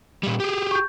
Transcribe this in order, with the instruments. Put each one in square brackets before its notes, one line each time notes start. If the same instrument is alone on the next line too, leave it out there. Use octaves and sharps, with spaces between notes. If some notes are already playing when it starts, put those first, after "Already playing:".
[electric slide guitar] A#2 G3
G4 G#4
[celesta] C#6 G6